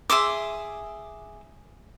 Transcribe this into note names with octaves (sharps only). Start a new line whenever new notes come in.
G#4 E5 C6 D6